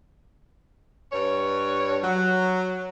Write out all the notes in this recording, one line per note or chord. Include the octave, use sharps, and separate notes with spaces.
G2 C#5
F#3